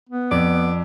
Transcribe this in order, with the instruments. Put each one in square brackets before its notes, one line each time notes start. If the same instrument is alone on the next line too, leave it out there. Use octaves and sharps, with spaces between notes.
[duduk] B3
[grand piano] F2 [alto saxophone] D5